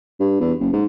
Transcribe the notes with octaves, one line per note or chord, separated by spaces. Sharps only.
G2
E2
F#1
G#2